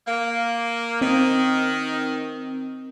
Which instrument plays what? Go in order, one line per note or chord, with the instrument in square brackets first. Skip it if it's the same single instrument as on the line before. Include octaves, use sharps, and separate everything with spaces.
[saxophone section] A#3
[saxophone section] D#3 [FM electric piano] C4